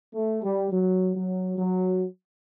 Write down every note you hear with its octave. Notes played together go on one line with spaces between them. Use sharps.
A3
G3
F#3
F#3
F#3